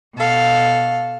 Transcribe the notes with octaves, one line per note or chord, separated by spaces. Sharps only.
B2 A4 F5